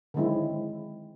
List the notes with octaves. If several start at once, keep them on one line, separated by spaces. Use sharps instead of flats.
D3 D#3 F#3 G#3 C4 E4